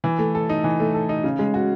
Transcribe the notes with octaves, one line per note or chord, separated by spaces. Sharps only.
E3
A3
A4
D#4
E3
A3
A4
D#4
C#3
G#3
F#4